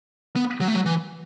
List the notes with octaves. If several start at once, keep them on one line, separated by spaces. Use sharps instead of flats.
B3
F#3
A3
F#3
E3